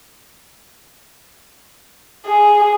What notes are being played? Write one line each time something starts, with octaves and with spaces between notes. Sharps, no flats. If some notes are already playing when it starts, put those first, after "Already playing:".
G#4